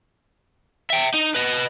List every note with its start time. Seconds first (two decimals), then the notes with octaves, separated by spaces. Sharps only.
0.90 E5 G5
1.14 D#4
1.35 B4 D#5